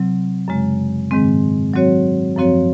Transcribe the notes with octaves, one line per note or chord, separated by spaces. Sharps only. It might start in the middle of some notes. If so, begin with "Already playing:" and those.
Already playing: C3 F#3 C4
F#2 C#3 G#3
G#2 D#3 G#3 C4
F#3 C4 F#4 C#5
F#2 F3 C4 F#4 C#5